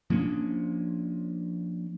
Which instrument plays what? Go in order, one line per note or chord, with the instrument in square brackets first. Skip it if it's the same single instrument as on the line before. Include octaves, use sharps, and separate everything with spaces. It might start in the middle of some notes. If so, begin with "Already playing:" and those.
[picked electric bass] F3 A#3 C#4 D4